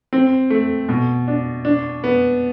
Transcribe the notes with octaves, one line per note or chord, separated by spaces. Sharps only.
C4
A3
B2
D4
D4
B3